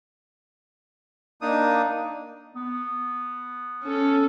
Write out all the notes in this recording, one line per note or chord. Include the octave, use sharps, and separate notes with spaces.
A#3 D4 D#4 D#6
B3
C#4 A4